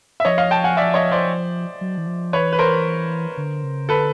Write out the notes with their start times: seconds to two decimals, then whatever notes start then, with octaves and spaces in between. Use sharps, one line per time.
0.20 E5
0.25 F3 C#5 D#5
0.38 D#5 F5
0.51 G5 A5
0.64 F#5 G#5
0.77 D5 E5
0.94 C#5 D#5
1.12 C5 D5
1.81 F#3
1.98 E3
2.07 F3
2.33 E3 B4 C#5
2.53 B4
2.59 A#4 C5
3.37 D3
3.64 C#3
3.89 D3 A4 B4